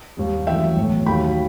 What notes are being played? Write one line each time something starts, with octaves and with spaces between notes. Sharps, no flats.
D#2 D#3 G3
F#2 E3 A3 E5 G5
B1 A2 E3 A3
D#2 D#3 F#3 A3 G5 B5